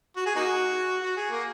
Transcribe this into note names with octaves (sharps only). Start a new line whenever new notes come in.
F#4
G#4
A#3 D#4 F#4
F#4
G#4
A#3